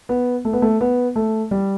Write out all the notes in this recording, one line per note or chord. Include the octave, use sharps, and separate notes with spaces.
B3
A3
B3
A3
B3
A3
G3